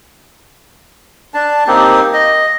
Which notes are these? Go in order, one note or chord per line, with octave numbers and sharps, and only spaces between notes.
D4 A5
A#3 C4 D#4 G4
D#5